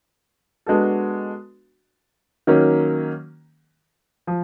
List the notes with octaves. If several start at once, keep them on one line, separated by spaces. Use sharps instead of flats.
G#3 B3 D4 F#4 A4
D#3 F#3 A#3 C#4
F3